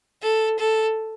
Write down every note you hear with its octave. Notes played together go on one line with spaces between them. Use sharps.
A4
A4